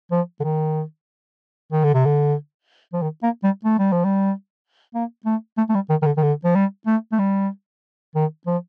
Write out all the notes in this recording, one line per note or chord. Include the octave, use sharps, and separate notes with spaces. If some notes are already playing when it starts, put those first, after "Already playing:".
F3
D3
D#3
D#3
D3
C3
D3
F3
D#3
A#3
G3
A3
G3
F3
G3
A#3
A3
A3
A3
G3
D#3
D#3
D3
D#3
D3
F3
G3
A3
A3
G3
D#3
F3